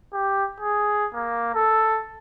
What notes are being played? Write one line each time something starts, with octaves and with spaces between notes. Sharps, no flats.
G4
G#4
A#3
A4